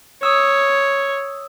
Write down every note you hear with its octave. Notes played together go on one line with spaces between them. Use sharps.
C#5 D#6 E6